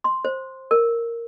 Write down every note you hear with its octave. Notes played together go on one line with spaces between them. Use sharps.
C6
C5
A#4